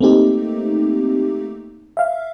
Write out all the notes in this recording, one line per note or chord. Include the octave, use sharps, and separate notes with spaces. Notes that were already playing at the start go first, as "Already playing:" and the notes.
A3 A#3 C4 D#4 G4
E5 F5